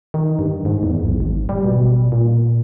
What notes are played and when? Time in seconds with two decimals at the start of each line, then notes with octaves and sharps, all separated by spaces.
0.14 D#3
0.39 G2
0.65 G#2
0.83 E2
1.05 B1
1.20 G#1
1.49 G3
1.64 B2
2.12 A#2